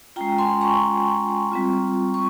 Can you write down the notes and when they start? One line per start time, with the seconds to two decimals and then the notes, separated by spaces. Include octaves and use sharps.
0.16 G#3 C#4 F4 G5 A#5
0.38 G#5 C6
0.61 A#5 C#6
1.52 G3 C4 F4
2.14 C#6